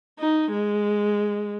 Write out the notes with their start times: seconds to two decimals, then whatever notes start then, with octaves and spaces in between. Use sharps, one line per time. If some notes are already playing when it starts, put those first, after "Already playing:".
0.19 D#4
0.51 G#3